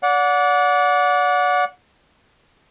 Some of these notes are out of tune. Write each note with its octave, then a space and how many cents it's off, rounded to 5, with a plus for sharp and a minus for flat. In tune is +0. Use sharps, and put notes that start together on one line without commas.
D5 -30 F#5 -25